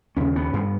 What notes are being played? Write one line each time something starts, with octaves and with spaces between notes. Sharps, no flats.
D#2 C#3 C#4
B3
G2